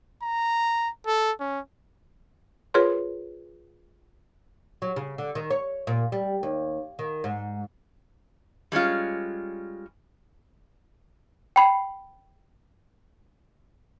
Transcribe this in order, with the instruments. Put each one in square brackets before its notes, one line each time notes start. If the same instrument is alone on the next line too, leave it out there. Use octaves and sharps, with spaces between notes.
[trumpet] A#5
A4
C#4
[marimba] F4 G#4 A#4 B4 C#5 C6
[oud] F#3
C#3
D3
D#3
C#5
A#2
G3
D#2
D#3
G#2
[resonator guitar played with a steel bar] G3 G#3 C#4 F4
[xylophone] G5 B5 C7